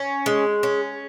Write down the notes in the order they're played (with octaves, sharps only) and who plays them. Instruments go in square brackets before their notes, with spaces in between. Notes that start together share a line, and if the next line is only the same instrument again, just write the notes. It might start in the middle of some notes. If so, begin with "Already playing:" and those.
Already playing: [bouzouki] C#4
G#3
C#4